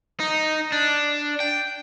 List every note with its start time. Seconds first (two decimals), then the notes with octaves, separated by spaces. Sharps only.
0.20 D#4
0.72 D4
1.40 G5